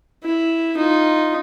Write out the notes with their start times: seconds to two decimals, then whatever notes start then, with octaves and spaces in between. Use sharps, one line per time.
0.24 E4
0.77 D#4 F4